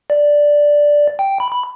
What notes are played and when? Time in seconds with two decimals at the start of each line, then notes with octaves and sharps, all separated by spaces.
0.10 D5
1.19 G5
1.40 B5
1.52 B5